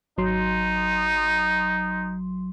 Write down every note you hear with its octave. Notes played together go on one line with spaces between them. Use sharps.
G#1 F#3 D#4 C6